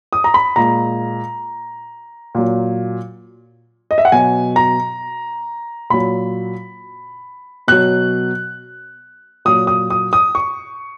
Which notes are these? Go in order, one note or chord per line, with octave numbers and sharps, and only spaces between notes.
D#6
A#5
B5
A#2 G#3 A#5
A#2 F#3
D#5
E5
F#5
B2 F#3 G#5
A#5
A#2 F#3 B5
B2 F#3 F#6
A#2 F#3 D#6
D#6
D#6
D#6
C#6